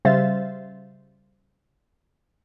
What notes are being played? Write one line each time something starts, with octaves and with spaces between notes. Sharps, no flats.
C#3 G3 C5 E5 F5 A6